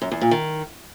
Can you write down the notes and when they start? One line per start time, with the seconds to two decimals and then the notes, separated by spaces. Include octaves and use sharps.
0.02 F#2
0.11 E2
0.21 A#2
0.31 D#3